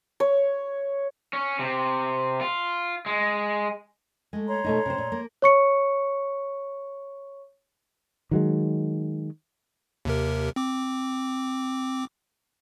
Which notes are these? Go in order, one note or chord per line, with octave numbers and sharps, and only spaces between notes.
C#5
C#4
C3
F4
G#3
G#3 A3
C#5 A#5 C6
B2 A3 D#4
C3 C5
A#2
A#3
C#5 C#6 C#7
D#3 F#3 G#3
D#2 C3 A#4
C4 D6